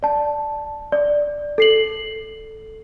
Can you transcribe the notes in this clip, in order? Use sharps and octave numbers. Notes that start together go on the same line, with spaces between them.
D5 A5
D5
A4 C7 F#7